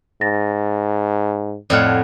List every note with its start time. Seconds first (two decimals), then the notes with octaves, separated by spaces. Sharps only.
0.21 G#2 A6 A#6
1.70 F2 A2 D5 D#5 F#5 F6